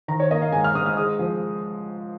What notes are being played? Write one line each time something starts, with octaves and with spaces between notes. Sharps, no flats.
D#3 A#5
C#5
A#3 D#5
F5
G#2 G#5
F6
G#2 D#6
F6
G#3 D#6
F3